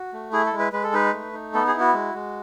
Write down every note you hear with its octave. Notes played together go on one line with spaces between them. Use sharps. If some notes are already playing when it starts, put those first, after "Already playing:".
Already playing: F#4
A3
E4 G#4
A4
G#3
B4
G#3 B4
A4
D#4 B4
A3
D#4
B3 A4
G#4
E4
F#4
G#3
G#3